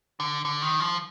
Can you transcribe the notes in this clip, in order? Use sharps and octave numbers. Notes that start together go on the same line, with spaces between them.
D3
D3
D#3
F3